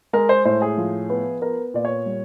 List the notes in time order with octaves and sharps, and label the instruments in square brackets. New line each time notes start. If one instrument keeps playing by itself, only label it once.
[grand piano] G#3 A#4
C5
A2 C5
G#4
F3
B3
B3 A#4
A#2 D5
C#5
G3